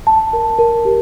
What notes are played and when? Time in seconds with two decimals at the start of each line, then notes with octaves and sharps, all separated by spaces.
0.07 A5
0.33 A#4
0.59 A#4
0.85 G4